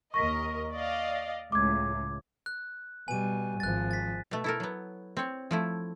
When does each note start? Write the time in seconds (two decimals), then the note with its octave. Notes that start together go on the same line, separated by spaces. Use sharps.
0.14 D#2 A#4 D#5 C#6 A#6 B6
0.74 D5 D#5 F5
1.52 C#2 A2 D6 G#6
2.46 F#6
3.08 B2 G3 G#5 D#7
3.60 G#1 F3 F#6 A6
3.91 A6 B6
4.31 B2 A3
4.44 E4 A4 A#4
4.60 F#3 B3
5.17 C4 C#5
5.51 F3 A3 E4